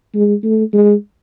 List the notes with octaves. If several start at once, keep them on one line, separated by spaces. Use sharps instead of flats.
G#3
A3
G#3